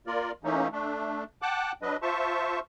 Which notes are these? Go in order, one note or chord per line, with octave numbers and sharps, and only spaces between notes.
A#3 F4 A#4 D5
E3 A3 A#3 C#4 D#4
A3 D4
F#5 G5 A5 D6 F#6
F#3 D4 B4 D#5
F4 C5 E5 A5 C#6